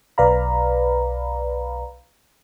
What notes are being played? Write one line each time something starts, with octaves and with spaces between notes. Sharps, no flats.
B1 B4 D5 F5 A#5 B5